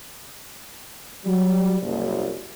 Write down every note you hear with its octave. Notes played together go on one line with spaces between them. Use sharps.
F#3 G3
F#1 C2